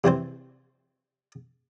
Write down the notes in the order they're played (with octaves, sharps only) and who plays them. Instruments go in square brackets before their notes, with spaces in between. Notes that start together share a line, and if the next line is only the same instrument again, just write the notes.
[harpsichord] C3 E3 C4 C5